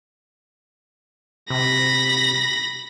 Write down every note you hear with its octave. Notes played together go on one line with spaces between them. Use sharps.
C3 B5 A#6